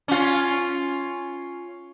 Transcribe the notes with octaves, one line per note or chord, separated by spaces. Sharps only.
C#4 F4